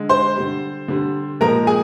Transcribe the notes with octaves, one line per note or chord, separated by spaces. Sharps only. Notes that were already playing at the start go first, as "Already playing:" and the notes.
Already playing: D3 G#3
C5 C6
D3 G3
D3 G3
A#2 F3 G#3 A#4 A#5
G#4 G#5